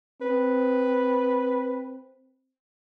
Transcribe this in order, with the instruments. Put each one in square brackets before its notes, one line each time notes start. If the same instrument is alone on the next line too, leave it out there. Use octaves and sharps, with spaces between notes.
[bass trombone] C4 [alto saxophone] B4